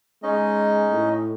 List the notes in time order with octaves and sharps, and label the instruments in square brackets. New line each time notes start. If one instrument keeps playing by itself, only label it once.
[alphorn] G#3 [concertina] C#4 D#4 D#5
[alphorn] A2